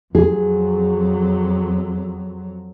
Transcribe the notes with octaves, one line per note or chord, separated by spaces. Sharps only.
F2 F#3 G#4